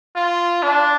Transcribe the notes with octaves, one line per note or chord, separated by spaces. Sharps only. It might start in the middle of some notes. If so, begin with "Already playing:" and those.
F4
D4